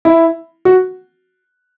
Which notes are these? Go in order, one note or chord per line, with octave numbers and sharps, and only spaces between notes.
E4
F#4